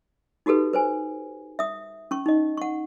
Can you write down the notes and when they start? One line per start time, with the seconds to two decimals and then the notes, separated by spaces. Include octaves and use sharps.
0.46 D#4 F#4 G4 A4 B4
0.73 B4 C5 G#5
1.59 E5 D#6
2.11 C#4 C#6
2.26 D#4 D#5
2.57 F#5 C#6